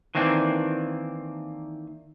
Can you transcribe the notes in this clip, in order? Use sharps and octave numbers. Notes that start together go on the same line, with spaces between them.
D#3 E3 A#3 C4 D4